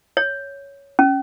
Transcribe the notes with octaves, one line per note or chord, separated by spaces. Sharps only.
C#5
C#4